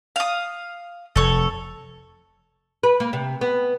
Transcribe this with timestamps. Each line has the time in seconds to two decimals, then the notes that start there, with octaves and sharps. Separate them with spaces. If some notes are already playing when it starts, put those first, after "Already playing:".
0.16 F5 D#6
1.16 F1 A4 C#5
2.83 B4
3.00 A#3
3.13 C3
3.41 B3